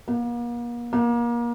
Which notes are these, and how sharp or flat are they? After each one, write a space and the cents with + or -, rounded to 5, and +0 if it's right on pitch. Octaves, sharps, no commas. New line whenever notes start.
A#3 +40
A#3 +30